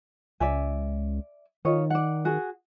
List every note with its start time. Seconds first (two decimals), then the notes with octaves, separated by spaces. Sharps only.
0.40 C#2 D5 E5 G#5
1.65 D#3 F4 C#5 D#5
1.90 D5 F#5
2.25 F#4 G#4